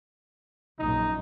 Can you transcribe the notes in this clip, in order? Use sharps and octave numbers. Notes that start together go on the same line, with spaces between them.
A#1 F#2 D#4